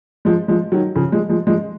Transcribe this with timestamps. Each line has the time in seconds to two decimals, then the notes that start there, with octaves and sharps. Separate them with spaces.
0.25 F3 G#3
0.48 F3 G#3
0.72 D#3 F#3
0.95 C#3 F3
1.12 F3 G#3
1.29 F3 G#3
1.47 F3 G#3